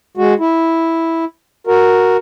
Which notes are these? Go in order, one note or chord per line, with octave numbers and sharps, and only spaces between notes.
G#3 F#4
E4
F#4 A#4